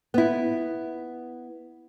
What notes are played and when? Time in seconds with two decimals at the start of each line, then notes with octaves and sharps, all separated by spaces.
0.14 B3 E4